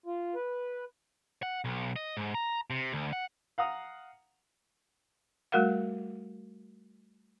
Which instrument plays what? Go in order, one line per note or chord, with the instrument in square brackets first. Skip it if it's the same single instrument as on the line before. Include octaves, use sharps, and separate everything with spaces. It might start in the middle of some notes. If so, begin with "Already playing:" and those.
[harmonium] F4
B4
[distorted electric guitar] F#5
B1
D#5
G#2
A#5
C3
D2
F#5
[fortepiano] F5 F#5 A#5 D#6
[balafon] G3 A3 F#4 A#4 F5 F#5